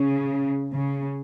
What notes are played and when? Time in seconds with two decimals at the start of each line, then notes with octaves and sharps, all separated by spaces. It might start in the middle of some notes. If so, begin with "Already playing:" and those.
Already playing: C#3
0.73 C#3